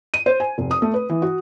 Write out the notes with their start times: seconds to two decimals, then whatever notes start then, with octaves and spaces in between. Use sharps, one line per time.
0.14 D#7
0.26 C5
0.40 G#5
0.58 F1
0.71 D#6
0.82 A3
0.94 B4
1.10 E3
1.22 F#4